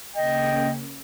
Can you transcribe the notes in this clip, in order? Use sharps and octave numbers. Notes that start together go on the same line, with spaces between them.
C#3 A#3 C#4 D#5 G5